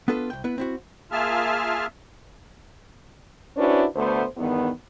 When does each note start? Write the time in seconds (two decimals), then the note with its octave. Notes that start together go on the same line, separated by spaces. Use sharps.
0.08 B3 D4 F4 A4 B4
0.30 C2 G5
0.44 B3 E4 B4
0.58 C4 E4 F#4
1.12 A#3 F4 G#4 E5 A5 F6
3.57 C#4 D4 E4 F#4 B4 C5
3.96 D2 A3 B3 C5
4.37 E2 G2 D#3 B3